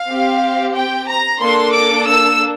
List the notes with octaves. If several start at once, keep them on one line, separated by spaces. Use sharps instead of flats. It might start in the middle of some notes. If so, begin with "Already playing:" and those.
Already playing: F5
C4 G4
G5
A#5
A#3 D4 A4 C6
D6
E6